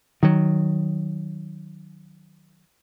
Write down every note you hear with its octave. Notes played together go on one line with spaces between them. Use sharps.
D#3 F#3